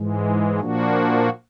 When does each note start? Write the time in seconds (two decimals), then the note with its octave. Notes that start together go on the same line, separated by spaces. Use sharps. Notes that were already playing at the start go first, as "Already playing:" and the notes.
Already playing: G#2 E3 G#3
0.59 A#2 F3 A#3 D4 F#4